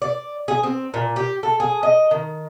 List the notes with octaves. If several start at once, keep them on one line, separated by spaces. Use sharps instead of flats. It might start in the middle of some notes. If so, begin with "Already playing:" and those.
D5
G#4
C4
A#2
G4
A4
G#4
D#5
D#3